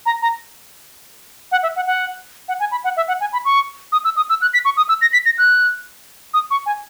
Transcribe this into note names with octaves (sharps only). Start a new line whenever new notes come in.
A#5
A#5
F#5
E5
F#5
F#5
F#5
G#5
B5
F#5
E5
F#5
G#5
B5
C#6
D#6
E6
D#6
E6
F#6
B6
C#6
D#6
E6
A#6
B6
A#6
F#6
D#6
C#6
G#5